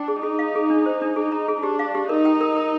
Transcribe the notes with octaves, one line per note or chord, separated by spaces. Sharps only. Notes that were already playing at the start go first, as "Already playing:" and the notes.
Already playing: D4 G5
G#4
D#4 G#4
F5
G#4
D4
C5
D4
D#4 G#4
A#5
G#4
D4 G4
F5
G4
D#4 A#4
G5
A#4
A#4